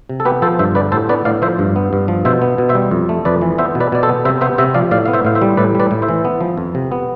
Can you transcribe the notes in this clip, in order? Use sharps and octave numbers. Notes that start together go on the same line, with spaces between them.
C3
A4
B3 G4 B4
F3 A4 C5
G2 C5 E5
D3 B4 D5
A2 A4 C5
B3 B4 D5
A2 D5 F5
F3 C5 E5
G2
B3
G2
F3
B2 C5 E5
B3
B2
C5 E5
G3
F2
A3
F2 B4 D5
E3
B3 C5 E5
B2
B4 D5
B2 D5
A4 C5
B3
C3 C5 E5
B3 C5 E5
C3 C5 E5
F3 D5 F5
A2 D5 F5
B3 F5
C5 E5
A2 F5
C5 E5
G3
A2 B4 D5
G3 B4 D5
A2
C5 E5
E3
B3
F3
F2
C3
B3